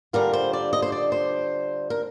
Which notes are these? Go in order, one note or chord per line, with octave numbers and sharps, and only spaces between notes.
D3 G3 D4 F4 A#4
C5
D5
D#5
C5
D5
C5
A#4